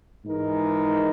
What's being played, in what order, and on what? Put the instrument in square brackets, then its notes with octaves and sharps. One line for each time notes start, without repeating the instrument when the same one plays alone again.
[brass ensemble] G#2 E3 G#3 D#4 A#4